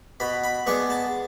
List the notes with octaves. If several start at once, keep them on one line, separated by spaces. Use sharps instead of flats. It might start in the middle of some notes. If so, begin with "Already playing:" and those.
B2 B5
B5
G#3 B3 D4 C#6
A5